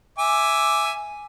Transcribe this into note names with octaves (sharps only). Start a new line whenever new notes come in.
E5 G#5 D6